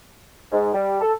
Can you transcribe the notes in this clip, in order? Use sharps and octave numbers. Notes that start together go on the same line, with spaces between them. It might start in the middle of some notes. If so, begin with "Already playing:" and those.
G#2
G3
A4